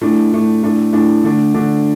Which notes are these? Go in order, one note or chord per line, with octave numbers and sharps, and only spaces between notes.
A2 A3 D4
A2 A3 D4
A2 A3 D4
A2 A3 D4
D3 A3 D4
D3 A3 D4